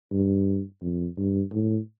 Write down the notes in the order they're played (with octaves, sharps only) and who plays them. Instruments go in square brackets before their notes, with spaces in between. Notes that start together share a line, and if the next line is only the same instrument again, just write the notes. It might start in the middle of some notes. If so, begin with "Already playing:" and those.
[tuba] G2
F2
G2
A2